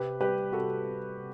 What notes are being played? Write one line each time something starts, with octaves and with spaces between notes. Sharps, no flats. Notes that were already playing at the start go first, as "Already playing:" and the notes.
Already playing: C3 G4 B4
G3 G4 B4
C3 F#4 A4
G3
C3